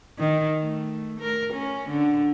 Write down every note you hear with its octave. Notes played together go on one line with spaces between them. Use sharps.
D#3
A3
A#4
C#4
D3